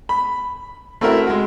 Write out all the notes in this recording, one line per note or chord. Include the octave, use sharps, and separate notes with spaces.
B5
A3 C4 E4 F#4 A#4 E5
G#3 F#4